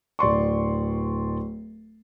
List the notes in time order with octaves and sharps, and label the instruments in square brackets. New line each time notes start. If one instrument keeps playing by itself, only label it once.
[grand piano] D1 D5 C6 C#6